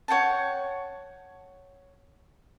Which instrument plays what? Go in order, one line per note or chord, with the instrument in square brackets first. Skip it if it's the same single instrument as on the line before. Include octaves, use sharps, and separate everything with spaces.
[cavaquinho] C#5 F#5 G5 A5